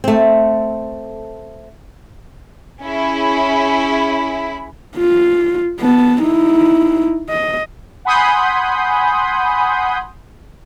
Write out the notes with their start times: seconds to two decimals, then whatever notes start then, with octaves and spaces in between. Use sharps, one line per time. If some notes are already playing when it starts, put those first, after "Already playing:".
0.04 A3 C4
2.83 C#4 E4 G#4 B5
4.97 F4
5.80 B3 A5
6.21 D#4 E4
7.29 D#5
8.05 F#5 G#5 B5 C6 D#6 G6